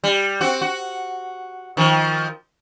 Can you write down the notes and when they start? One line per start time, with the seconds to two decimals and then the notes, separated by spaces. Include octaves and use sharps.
0.04 G3
0.41 C4 F#4
0.62 F#4
1.77 D#3 F3